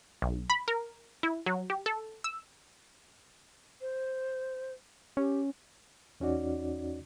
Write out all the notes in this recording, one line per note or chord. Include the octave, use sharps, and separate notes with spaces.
B1
B5
A#4
E4
F#3
G4
A4
E6
C5
C#4 G4
E2 C#4 D#4 F#4 D5